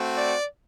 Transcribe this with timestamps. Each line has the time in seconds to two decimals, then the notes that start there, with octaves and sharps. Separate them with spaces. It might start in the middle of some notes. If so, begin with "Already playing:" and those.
Already playing: A3 C4 F#4
0.16 D5